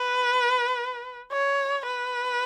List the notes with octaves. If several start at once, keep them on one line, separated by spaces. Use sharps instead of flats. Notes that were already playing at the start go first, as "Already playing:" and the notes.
Already playing: B4
C#5
B4